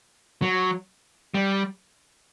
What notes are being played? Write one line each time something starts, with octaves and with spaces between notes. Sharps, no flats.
F#3
G3